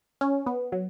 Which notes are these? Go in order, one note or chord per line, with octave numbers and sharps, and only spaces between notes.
C#4
B3
F#3